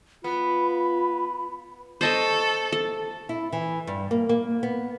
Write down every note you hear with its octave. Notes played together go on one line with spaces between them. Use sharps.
B3 F4 B5
A4 C5 D#5 C#6
A4
E4
E3
G2
A#3
A#3
B3